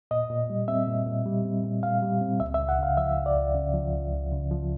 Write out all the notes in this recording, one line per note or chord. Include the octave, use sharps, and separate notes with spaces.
A#2 D#5
A#2
G3
C4 E5
A#2
A#2
G3
C4
A#2
A#2 F5
G3
C4
C#2 E5
E5
C#2
F#5
C#3 F5
F3 E5
C#2
D5
C#2
C#3
F3
C#2
C#2
C#3
F3